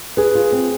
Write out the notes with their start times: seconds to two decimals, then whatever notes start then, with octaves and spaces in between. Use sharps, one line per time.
0.17 G#4 B4
0.35 F4
0.52 C4